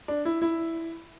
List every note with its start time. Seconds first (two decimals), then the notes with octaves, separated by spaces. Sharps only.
0.08 D4
0.25 E4
0.42 E4